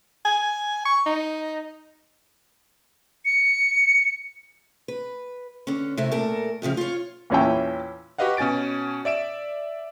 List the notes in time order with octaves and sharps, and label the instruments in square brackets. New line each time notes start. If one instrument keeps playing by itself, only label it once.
[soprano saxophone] G#5
C#6
D#4
[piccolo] C#7
[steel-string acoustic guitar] B4
D3 C#4
C3 A3 E4
A#2 A4 A#4
F2 A2 C#3 F3
F4 C#5
[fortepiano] E2 A#2 C#4 E4 G5
[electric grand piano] F#4 G4 B4 D#5 F5 F#5
B2 C#4 G#5 A6 D7
D5 E5 D7 E7